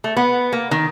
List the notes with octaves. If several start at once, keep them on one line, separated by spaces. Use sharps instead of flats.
A3
B3
A#3
D#3